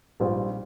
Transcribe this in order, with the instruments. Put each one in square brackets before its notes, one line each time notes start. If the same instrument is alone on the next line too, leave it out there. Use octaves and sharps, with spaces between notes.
[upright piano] A#1 G#2 G3 C4 F4